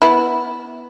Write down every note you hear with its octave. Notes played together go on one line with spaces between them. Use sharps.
B3 E4